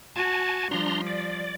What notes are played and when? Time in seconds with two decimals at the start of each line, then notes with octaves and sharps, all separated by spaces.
0.16 F#4 G#5 A5
0.71 F3 G3 D4 A#5 C6
1.07 D5